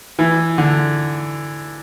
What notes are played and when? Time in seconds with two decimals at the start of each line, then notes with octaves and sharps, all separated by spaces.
0.19 E3
0.58 D3